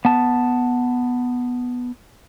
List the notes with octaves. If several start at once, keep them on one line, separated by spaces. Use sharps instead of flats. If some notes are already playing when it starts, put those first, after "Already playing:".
B3 A5